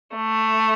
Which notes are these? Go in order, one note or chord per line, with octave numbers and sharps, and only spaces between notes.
A3